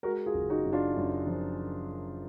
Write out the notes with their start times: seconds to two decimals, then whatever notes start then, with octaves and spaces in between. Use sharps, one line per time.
0.03 G#3 F#4 A#4
0.26 F4 G#4
0.34 F#1
0.50 D#4 F#4
0.65 F#2
0.73 D4 F4
0.96 F#2
1.27 F3